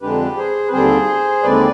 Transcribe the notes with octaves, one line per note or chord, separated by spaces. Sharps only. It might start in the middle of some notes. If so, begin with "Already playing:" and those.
F2 D3 G#3 D4 G4 B4
G#4 C5
B4
D#2 D3 G3 C4 G#4 C5
D#2 D3 G#3 C4 B4 D5